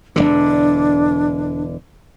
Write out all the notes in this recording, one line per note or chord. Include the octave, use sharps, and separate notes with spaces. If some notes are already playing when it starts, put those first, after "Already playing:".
E1 A#1 D3 D4